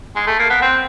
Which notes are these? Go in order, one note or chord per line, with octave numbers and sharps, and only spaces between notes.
G#3
A3
A#3
B3
C4